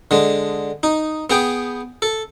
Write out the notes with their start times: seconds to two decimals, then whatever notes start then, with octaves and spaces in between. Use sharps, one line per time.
0.11 D3 G#3
0.83 D#4
1.30 B3 G#4 G5
2.02 A4